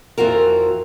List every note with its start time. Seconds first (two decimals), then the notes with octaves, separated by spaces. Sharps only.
0.18 F2 E3 F4 F#4 A#4